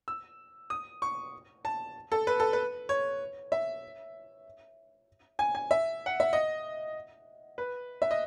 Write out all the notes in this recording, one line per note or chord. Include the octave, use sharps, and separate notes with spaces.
E6
D#6
C#6
A5
A4
B4
A4
B4
C#5
E5
G#5
G#5
E5
F#5
E5
D#5
B4
E5
D#5